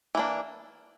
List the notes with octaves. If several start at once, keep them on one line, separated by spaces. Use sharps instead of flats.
E3 A#3 D4